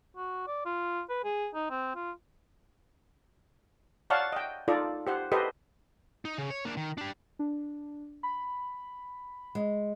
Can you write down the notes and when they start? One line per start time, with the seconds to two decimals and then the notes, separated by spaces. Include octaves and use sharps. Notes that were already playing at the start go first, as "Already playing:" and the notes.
0.17 F#4
0.47 D5
0.65 F4
1.10 B4
1.24 G#4
1.55 D#4
1.70 C4
1.95 F4
4.10 C#5 D5 F5 F#5 A5 C#6
4.32 D#5 G5
4.68 D#4 F4 A4 D5
5.07 G4 C5 F#5
5.32 G4 A4 B4 C5 D#5
6.25 D#4
6.38 C#3
6.50 C#5
6.65 A#3 D4
6.77 D#3
6.98 D4 G4
7.39 D4
8.23 B5
9.55 G#3